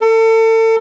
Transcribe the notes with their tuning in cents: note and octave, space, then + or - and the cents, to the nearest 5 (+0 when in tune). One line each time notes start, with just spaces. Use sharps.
A4 +35